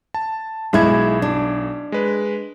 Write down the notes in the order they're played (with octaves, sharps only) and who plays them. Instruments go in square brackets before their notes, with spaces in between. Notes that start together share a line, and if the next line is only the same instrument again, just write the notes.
[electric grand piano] A5
[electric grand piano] B1 G#6 [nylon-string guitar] G#3 E4
[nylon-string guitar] D4
[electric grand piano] G#3 B4